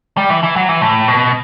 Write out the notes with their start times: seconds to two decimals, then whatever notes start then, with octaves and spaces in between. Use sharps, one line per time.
0.17 G3
0.30 E3
0.43 E3
0.56 F#3
0.69 E3
0.81 A2
1.08 B2